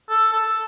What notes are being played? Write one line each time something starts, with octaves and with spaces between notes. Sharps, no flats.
A4
A4